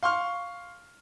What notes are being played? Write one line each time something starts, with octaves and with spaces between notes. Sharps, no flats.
F5 C6 C#6 F6